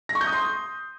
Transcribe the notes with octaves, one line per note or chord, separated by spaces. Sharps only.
A#6
C#6
G6
D#6
C6